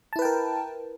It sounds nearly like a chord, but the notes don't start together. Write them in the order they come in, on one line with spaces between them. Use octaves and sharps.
A5 E4 B4 G5 A#4